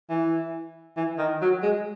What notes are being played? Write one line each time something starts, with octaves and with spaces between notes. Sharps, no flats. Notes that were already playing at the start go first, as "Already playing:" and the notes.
E3
E3
D#3
F#3
G#3